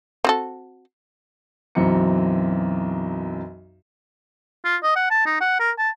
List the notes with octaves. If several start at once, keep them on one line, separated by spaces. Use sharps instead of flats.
C4 F#4 A4
B1 F#2 E3 C4 A#5 C#7
F4
D#5
F#5
A5
D#4
F#5
A#4
A5